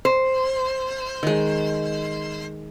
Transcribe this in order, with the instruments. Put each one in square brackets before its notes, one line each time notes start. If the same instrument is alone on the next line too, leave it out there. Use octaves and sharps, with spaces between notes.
[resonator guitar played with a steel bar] C5
[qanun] D#3 G#3